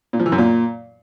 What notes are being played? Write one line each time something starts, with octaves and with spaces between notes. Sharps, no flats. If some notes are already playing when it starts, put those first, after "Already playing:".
A#2
F3
E3
F#2
A#2